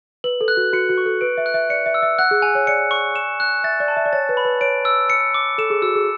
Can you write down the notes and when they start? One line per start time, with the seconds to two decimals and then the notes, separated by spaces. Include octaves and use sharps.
0.24 B4 F#7
0.41 A4
0.48 F#6
0.57 F#4
0.73 F#4 C#7
0.89 F#4
0.98 C#6
1.06 A4
1.21 B4 D7
1.37 E5
1.46 F#6
1.54 E5
1.70 D5 C#7
1.86 E5
1.94 E6
2.02 E5
2.19 F#5 F#6
2.31 G#4
2.42 G#5
2.55 C#5
2.67 D5 C#7
2.91 C#6
3.16 E7
3.40 F#6
3.64 E5 A6
3.80 D5
3.88 A5
3.97 E5
4.06 D5
4.13 C#5 A6
4.29 B4
4.37 B5
4.45 B4
4.61 C#5 D7
4.85 E6
5.10 C#7
5.34 D6
5.58 A4 E7
5.70 G#4
5.82 F#4 E6
5.95 G#4